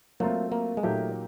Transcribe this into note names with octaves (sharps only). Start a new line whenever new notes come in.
F#3 A3 A#3 C4 F4
A#3
G#3
A#2 F#3 A3 A#3 D#4 G4